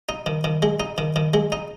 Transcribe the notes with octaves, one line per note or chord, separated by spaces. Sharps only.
D#4
D#3
D#3
G#3
D#4
D#3
D#3
G#3
D#4